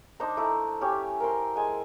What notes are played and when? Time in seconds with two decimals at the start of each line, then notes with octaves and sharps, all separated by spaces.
0.20 D4 D#4 C5 A#5
0.37 A3 E4
0.81 C#4 G4
1.20 A#4 C5 C6
1.56 G#3 G#5